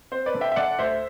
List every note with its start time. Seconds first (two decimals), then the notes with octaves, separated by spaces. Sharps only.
0.12 C4 C5
0.26 B4 D5
0.34 D3
0.41 E5 G5
0.52 E5
0.56 D3 D5 F#5
0.79 D2 C5 E5